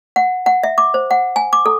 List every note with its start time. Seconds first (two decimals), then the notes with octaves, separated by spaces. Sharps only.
0.16 F#5
0.46 F#5
0.63 E5
0.78 D6
0.94 C5
1.11 F#5
1.36 G#5
1.53 D6
1.66 A4